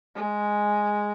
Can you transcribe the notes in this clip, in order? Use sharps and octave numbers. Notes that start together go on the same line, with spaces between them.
G#3